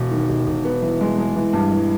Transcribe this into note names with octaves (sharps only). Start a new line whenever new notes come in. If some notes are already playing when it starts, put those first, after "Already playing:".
Already playing: E1
D#3
E1
E1
B3
E3
G#3
G#3
E3
G2
E3